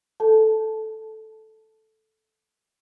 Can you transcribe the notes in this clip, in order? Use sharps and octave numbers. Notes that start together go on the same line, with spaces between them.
A4 A5